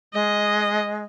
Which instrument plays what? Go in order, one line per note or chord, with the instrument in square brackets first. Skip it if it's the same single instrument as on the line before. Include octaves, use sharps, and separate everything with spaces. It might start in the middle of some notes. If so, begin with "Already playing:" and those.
[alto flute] G#3 [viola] D#5